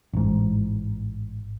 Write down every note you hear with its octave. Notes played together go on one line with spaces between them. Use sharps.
A1 G#2